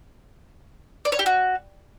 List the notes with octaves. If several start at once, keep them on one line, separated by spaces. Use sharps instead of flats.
D5
C#5
G4
F#4